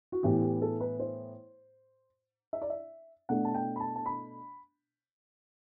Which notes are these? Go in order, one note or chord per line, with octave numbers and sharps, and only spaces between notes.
F#4
A2 E3 B3 G4
G4
A4
B4
C5
E5
D5
E5
B2 A3 D4 F#5
A5
G5
B5
A5
A5
B5